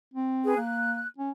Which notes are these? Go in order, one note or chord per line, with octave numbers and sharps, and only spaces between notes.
C4
G#4 B4
A#3 F#6
C#4